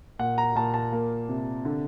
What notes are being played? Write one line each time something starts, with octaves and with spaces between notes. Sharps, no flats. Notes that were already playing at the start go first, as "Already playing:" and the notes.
A#2 F#5
A#5
A#2 A5
A5
A#3
C3
D3